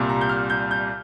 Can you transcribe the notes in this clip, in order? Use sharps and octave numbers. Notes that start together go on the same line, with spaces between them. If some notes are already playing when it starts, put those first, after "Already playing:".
Already playing: C2 A#2 G3
A#5
G6
F6
G6
G6